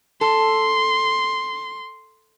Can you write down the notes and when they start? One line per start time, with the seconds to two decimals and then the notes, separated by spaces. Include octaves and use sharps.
0.21 A4 C6